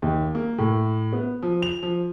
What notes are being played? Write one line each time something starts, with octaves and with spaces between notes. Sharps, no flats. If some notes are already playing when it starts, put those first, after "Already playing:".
D#2
A#3
A2
B3
F3
F7
F3